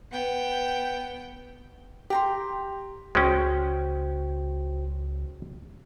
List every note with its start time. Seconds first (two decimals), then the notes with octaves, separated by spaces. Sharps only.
0.11 B3 G5
2.10 G4 G5 A#5 C6
3.15 C#2 G#3 C#4 F#4 C5 G5